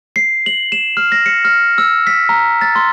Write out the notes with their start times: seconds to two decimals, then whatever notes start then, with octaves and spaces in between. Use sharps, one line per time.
0.16 C7
0.46 F#7
0.72 E7
0.97 F6
1.12 A#6
1.26 C#7
1.45 F6
1.78 E6
2.07 B6
2.29 A#5
2.61 A6
2.75 C6